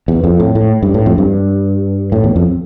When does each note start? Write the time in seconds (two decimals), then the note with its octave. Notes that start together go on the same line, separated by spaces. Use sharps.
0.08 E2
0.24 F2
0.40 A2
0.55 A2
0.83 G2
0.94 A2
1.06 F2
1.18 G2
2.12 A2
2.24 E2
2.36 F2